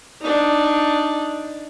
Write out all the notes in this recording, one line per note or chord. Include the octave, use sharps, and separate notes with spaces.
D4 D#4